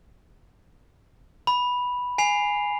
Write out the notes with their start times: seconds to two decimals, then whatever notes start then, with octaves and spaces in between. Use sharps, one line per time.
1.47 B5
2.18 G#5 C7 F7